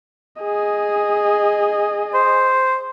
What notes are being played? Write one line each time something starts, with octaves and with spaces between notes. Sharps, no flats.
G#4 D#5
C5